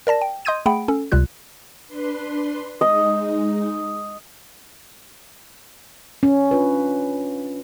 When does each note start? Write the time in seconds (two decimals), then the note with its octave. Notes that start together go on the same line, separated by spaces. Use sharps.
0.07 A#4 D5 A5 A#6
0.21 G5
0.45 D#5 C6 D#6 G6 G#6 D#7
0.66 A3 G#4 F#5 G5 B5 D7
0.88 C#4 A4
1.12 C#2 C3 G3 F4 F#6
1.87 D4 B4 C6
2.81 G#3 D#4 D#5
6.23 C#4
6.51 D4 F4 B4